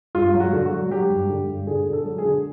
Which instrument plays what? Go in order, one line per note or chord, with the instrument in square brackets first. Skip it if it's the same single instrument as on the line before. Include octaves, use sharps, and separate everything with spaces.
[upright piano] G2 F4
F#3
F#4
D3
F#4
F#3
F#3 G4
G2
D3
G2
D3 G#4
D3
A4
F#3
G#4
D3